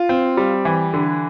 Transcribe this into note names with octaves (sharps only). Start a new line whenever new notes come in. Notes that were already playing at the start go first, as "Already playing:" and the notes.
Already playing: F4
C4
G3
E3
D3